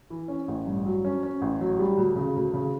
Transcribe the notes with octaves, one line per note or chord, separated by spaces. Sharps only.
E3
C#4
A1
G2
F#3
C#4
C#4
A1
F#3
G3
D2
C#3
D2
C#3